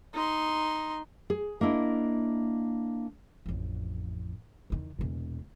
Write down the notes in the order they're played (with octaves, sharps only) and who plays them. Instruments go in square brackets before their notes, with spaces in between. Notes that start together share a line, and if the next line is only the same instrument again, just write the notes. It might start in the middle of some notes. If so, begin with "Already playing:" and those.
[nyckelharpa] D#4 C6
[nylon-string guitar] G#4
A#3 D4 E4 D#5
[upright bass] A1 F2
E2 D#3
E1 A#2